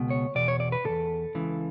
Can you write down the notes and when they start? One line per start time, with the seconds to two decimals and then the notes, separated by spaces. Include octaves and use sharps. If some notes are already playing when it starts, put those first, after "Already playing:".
Already playing: C#2 B2
0.10 C#5
0.35 E2 B2 D5
0.48 C#5
0.60 D5
0.72 B4
0.85 E2 B2 A4
1.35 C#2 C#3 E3